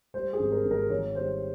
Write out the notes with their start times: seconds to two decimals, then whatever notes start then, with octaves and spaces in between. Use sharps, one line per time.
0.14 G3 C5
0.33 G#4
0.39 G#1
0.52 A#4
0.65 G#1
0.71 A#4
0.90 D#3 C#5
1.15 G3 C5